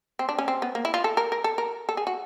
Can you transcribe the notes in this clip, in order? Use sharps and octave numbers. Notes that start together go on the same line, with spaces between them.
C4
D4
C#4
C4
B3
A#3
E4
F4
A4
A#4
A#4
A4
A#4
A4
G#4
F#4